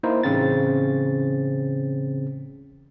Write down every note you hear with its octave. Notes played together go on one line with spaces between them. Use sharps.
A#3 D#4 E4 C5
A1 C#3 C4 A6